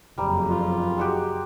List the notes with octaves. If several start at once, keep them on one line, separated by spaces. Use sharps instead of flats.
F#1 F2 G3 A#5
F4
G#3 F#4 G4